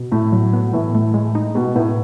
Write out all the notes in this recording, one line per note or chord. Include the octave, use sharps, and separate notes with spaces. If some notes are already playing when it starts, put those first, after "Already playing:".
Already playing: B2
A2 A3
F#3
B3
A2 E3
A3
G#3
D#4
B2 G#3
A2 B3